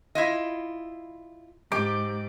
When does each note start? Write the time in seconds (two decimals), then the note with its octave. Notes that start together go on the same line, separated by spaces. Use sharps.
0.15 E4 F4 D#5
1.72 G#2 G4 D6